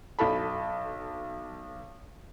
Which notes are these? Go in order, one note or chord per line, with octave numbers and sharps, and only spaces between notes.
B1 A4 A5 B5